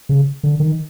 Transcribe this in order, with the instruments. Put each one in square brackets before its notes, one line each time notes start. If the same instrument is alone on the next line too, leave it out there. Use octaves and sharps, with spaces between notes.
[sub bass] C#3
D3
D#3